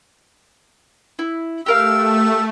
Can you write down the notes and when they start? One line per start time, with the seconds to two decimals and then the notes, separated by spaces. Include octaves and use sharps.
1.19 E4
1.66 A3 G4 A#4 F5 E6